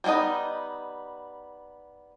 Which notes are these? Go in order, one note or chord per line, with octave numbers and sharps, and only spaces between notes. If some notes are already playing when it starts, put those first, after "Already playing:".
G3 A#3 B3 D#4 D#5